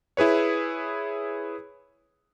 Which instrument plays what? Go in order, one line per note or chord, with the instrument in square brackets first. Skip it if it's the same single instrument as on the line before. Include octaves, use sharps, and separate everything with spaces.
[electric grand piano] E4 G#4 B4 C#5